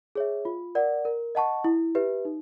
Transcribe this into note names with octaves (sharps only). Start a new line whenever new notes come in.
G#4 C#5 E5
F4
A#4 D5 F#5
A#4
D#5 F#5 A5 C#6
E4
G4 B4 E5
D#4